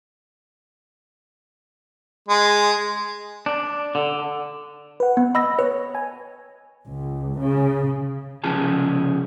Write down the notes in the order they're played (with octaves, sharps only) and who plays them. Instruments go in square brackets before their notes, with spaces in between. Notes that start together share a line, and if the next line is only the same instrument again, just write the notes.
[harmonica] G#3
[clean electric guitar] D4
D3
[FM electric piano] B4 F#5
[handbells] B3
[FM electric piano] D#5 [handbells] B5 E6 A#6
[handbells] B4 [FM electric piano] C#5
[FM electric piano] G#5
[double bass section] C#2
C#3
[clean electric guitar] C2 C#3 F3 G#4 A5